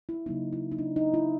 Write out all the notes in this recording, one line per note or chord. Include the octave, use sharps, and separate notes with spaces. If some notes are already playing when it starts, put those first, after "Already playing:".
E4
C#3 F#3 A#3 D#4
E4
D#4
D4
D#4
E4